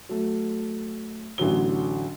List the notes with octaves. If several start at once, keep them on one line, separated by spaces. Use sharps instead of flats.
F#3 A3
A1 D3 F#3 G7